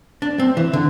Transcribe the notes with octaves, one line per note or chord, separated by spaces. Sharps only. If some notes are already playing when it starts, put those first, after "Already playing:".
D4
C4
E3
D3